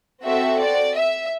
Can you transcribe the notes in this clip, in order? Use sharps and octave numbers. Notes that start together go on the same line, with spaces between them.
C4 F#4 A4 E5
D5
E5